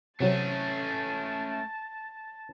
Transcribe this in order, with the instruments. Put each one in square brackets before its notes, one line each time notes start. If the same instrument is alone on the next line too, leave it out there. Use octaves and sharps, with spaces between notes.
[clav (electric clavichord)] C3 F#3 [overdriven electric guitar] A3 C#4 [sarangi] A5